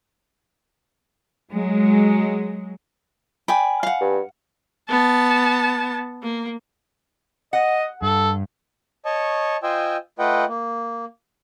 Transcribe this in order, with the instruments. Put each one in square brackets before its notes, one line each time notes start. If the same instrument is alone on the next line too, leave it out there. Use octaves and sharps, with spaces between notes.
[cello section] F#3 G#3
[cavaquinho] D5 G#5 B5 [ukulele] G5
[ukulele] F5 F#5
[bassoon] G2
[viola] B3 A5
A#3
[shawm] D#5 [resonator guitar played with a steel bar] F#5
[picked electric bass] G2 [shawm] A4
[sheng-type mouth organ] C#5 D#5 A5 C#6
F4 C5 D#5 G5 G#5 E6
A3 F4 B4 D#5 F#5 G5
A#3